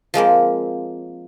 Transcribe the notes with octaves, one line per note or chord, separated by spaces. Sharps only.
F3 G#3 A#3 C4